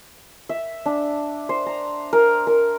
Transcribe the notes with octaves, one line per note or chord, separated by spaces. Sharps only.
E5
D4
C5
A#5
A#4
A#4